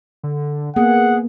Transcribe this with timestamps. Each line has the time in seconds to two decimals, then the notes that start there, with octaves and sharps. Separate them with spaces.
0.23 D3
0.76 A#3 B3 G#4 F#5